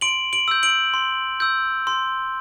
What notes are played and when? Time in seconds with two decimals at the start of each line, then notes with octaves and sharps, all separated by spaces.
0.01 C6 D7 F#7
0.33 D7 F#7
0.48 E6 G6
0.63 D7 F#7
0.94 C6
1.40 E6 G6
1.87 C6